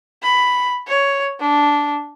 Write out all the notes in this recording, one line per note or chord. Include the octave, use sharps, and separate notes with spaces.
B5
C#5
D4